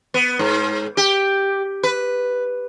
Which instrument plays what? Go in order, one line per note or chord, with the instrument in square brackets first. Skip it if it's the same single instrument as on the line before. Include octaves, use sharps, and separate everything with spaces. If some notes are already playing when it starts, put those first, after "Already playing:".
[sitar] B3
G#2
G4
B4